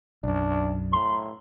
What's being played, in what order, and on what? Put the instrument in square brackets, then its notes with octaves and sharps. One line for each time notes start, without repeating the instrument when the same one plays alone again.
[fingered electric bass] B1 F#2 [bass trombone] D4
[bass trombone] A2 [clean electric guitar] A#5 C6